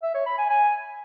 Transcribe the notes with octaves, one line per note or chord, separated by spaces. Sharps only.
E5
C#5
B5
G#5
G#5